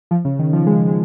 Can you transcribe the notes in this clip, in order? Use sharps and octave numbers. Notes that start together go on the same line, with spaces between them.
F3
C#3
D#3
F3
G#3
G#3